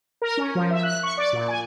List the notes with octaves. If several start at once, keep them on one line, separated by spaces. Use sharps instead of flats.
A#4
C#4
F3
E5
F#6
C#6
D5
A#2
G#5